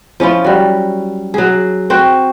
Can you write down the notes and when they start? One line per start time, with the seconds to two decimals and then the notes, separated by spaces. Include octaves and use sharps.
0.20 F3 C#4 E4 F4
0.44 F#3 G3
1.34 F#3 G#4
1.90 C4 F#4 C5